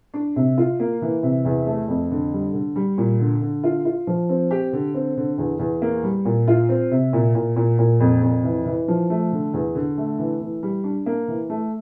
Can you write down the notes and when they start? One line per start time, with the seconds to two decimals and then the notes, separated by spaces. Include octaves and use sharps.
0.14 D4
0.36 C3
0.58 F4
0.80 A#3
1.02 E3
1.23 C3
1.45 E2
1.67 A3
1.88 F2
2.11 D3
2.33 G3
2.54 D3
2.76 G3
2.98 A#2
3.20 D3
3.42 D3
3.64 F4
3.85 F4
4.07 F3
4.29 C4
4.51 G4
4.73 D3
4.94 C4
5.17 D3
5.38 E2
5.59 E2
5.82 A#3
6.03 G3
6.25 A#2
6.48 F4
6.69 C4
6.91 C3
7.13 A#2
7.35 A#2
7.56 A#2
7.79 A#2
8.00 F2
8.22 F2
8.44 E3
8.66 E3
8.88 F3
9.10 A3
9.32 D3
9.54 E2
9.75 D3
9.98 A3
10.19 E3
10.41 E3
10.63 G3
10.84 D4
11.06 A#3
11.28 E3
11.50 A3